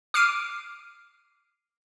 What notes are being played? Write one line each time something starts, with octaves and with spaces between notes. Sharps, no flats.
D6 F6 C7 D7 D#7